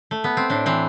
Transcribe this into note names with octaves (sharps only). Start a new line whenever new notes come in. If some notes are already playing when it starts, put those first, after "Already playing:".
A3
B3
C4
A2 D4
E3 C4